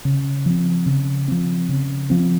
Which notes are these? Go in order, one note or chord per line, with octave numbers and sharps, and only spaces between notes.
C#3
F3 C4
C#3
F3 C4
C#3
F3 C4